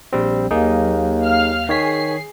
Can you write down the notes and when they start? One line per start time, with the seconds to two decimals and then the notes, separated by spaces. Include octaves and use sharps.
0.13 A#1 G3 C4
0.51 D#2 F#3 A#3 D#4 G#4
1.23 F5 F6
1.69 D#3 G#4 C#5 B6 C7